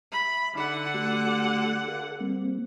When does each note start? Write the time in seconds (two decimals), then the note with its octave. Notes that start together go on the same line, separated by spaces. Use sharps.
0.12 E5 B5
0.55 D3 D#4 E5 F#5
0.94 A3 F#4 G4
1.88 G#4 A#4 F5
2.21 G3 A#3 C4